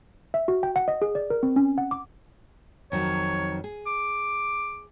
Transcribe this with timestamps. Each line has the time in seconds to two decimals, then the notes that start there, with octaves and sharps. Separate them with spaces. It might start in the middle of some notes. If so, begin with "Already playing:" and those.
0.34 E5
0.48 F#4
0.63 G5
0.76 F#5
0.88 D#5
1.02 G#4
1.15 D5
1.30 A#4
1.43 C4
1.56 C#4
1.78 F#5
1.91 D6
2.92 F2 D#3 F#3 C#5
3.64 G#4
3.87 D6